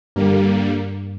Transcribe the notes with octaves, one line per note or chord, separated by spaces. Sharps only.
G2 D3 G3 A#3